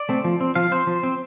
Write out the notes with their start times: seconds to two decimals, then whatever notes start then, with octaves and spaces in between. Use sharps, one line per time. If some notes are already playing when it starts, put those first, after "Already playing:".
Already playing: D5
0.09 A3 C4
0.24 F3
0.41 C4
0.55 F3 F5
0.71 C4 C5
0.87 F3
1.03 C4